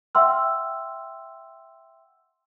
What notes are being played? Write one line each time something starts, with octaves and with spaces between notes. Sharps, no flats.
E5 F#5 G5 C6 E6 F6